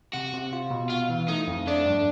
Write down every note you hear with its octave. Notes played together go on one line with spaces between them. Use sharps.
C3 F#4
C3
F4
B2
F4 F#4
E3
A3 D#4
F2
A3 D4
G2